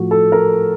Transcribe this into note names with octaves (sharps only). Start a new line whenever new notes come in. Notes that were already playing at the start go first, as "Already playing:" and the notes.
Already playing: A2 F3 F#4
A4
A#4